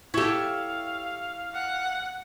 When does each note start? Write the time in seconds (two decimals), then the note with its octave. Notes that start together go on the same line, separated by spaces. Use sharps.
0.14 E4 G4 A4 C#5 F5
1.54 F#5